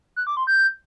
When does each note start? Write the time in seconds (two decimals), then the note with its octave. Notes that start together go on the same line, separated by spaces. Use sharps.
0.16 F#6
0.27 D6
0.37 C6
0.47 G6